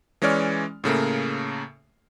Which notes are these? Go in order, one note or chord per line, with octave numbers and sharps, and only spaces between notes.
E3 G#3 C#4 C#5 D5 F6
A2 C#3 A3 A#3